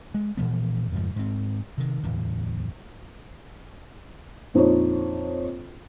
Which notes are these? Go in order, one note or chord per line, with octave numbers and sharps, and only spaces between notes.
G#3
A#2 E3 F3 B3
F2 G#2 C#3 F3
G#2 C4
C3 D#3
D1 E2 A2
A#1 F2 D#4 C5 C#5